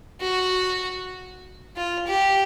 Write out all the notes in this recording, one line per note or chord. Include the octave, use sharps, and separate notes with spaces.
F#4
F4
G4